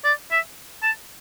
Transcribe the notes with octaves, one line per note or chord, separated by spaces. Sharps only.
D5
E5
A5